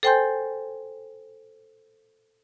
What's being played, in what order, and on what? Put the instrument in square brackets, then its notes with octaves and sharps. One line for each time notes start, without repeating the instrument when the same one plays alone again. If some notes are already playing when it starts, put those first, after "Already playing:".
[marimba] A4 C5 G5 G#5 C6 G6